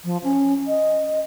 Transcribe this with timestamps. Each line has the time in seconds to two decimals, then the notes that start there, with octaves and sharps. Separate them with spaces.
0.05 F3
0.24 C#4
0.68 D#5